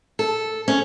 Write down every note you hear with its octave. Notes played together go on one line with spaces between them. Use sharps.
A4
C#4